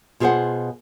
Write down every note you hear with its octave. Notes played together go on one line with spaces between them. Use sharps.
B2 F4 G#4 A4 C5 F#5